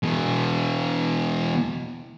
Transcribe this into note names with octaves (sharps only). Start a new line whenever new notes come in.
B2 E3